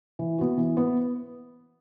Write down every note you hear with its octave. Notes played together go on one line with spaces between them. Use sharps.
E3
B3 F#4
E3
B3